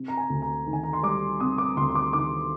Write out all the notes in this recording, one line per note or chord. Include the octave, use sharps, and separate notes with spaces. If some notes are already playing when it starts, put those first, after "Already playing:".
Already playing: C3
A#5
G#5
D2
A#5
D#3
G#5
A#5
C6
G3 D6
C3 D#6
D6
D2 C6
C6
D6
D#3 D6